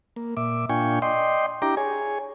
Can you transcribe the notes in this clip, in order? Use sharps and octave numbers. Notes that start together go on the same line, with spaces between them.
A#3
A#2 E5 D6
A#2 D4 F4 G5 G#5 C#6
D5 D#5 G5 C6
D4 E4 G4 G5 A#5 D6
G#4 C#5 G#5